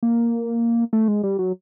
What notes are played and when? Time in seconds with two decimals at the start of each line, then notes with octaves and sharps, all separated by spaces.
0.03 A#3
0.93 A3
1.08 G#3
1.23 G3
1.39 F#3